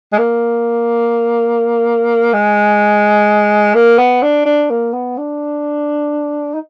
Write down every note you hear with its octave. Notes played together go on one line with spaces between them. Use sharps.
G#3
A#3
G#3
A#3
B3
D4
D4
A#3
B3
D4
D#4